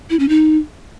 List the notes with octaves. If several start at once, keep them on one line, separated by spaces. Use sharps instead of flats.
E4
C#4
D#4